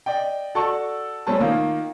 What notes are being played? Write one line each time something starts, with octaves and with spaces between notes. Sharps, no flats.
D5 D#5 G5
F#4 A4 D5 A5 C#6
A#2 G3 A3 C4 C#4 A5
D#3 A#3 F4